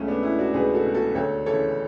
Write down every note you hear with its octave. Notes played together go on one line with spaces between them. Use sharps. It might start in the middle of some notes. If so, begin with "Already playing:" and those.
Already playing: C#2 A3 C#4
B3 D4
B2 C#4 E4
D4 F#4
C#2 G#4 B4
F#4 A4
B2
F#4 A4
D2 A4 C#5
C#3 E3 A4 C#5